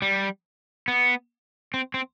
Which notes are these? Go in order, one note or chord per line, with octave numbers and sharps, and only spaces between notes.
G3
B3
C4
C4